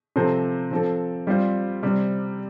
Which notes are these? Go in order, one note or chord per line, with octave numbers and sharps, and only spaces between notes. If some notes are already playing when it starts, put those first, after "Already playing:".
C3 F3 C4 A4 C5
F3 C4 A4
G3 C4 F4 C5
C3 G3 C4